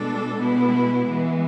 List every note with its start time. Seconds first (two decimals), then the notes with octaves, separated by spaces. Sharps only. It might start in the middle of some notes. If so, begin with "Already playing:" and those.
Already playing: B2 G#3 D4 A4
0.37 B2 G#3 B3 E4
1.08 E3 G#3 B3